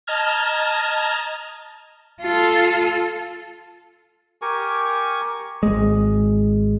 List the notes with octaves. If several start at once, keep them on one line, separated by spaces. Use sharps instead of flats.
D#5 A5 A#5 F6 G#6
F4 A4
G4 A#4 G#5 C#6
G#1 G#3